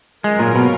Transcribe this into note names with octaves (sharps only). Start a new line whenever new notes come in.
G#2 F#3 G#3 C#4 F4 A#4
A#2
B2